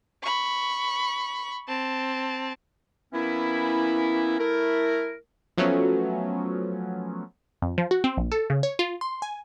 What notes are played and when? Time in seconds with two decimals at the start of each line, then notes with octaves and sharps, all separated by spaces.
0.24 B5 C#6
1.68 C4 A5
3.13 E3 A#3 B3 C#4 E4
4.39 A3 E4 A#4
5.57 F3 F#3 A3 B3 C#4
7.62 F2
7.78 F3
7.91 F#4
8.04 C4
8.17 A#1
8.32 A4
8.50 C#3
8.63 C#5
8.79 F4
9.01 C6
9.22 G#5